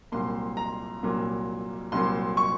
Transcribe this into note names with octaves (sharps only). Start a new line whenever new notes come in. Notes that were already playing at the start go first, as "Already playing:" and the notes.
C2 A#2 F#3 A#3 C6
A#5
C2 A#2 F#3 A#3
C2 A#2 F#3 A#3 C6
C#6